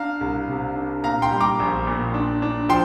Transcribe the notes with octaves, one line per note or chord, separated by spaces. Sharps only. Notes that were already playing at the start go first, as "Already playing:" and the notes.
Already playing: D4 F5 A#5
C2
C3
D4
A#2 F5 A#5
G5 C6
G3
A#5 D6
A#1
A#2
D4
D4
F3 G5 C6